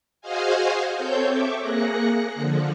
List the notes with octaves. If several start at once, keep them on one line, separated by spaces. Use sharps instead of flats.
F#4 G#4 C5 D#5 F5 G#5
C4 A4 C#5 G6
E5 C#6 D6
A#3 G#4 F#6 A#6 C#7
D3 F3